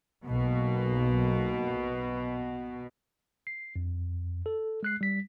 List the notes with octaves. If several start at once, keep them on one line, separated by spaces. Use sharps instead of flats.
B1 B2 A#3
C7
F2
A4
G#3 F#6 C7
G3 B6